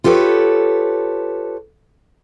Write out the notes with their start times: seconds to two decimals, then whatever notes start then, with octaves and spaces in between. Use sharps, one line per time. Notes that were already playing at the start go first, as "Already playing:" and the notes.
0.04 F4 G4 A4 B4 C#5